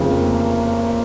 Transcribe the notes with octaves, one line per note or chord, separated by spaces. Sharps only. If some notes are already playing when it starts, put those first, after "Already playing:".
Already playing: F1 F2 C#3 F3
A#3